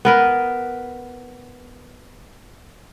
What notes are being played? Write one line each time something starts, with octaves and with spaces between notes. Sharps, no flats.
B3 A#4 B4